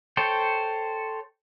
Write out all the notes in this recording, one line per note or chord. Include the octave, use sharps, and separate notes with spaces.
A4 C5 C#5 G5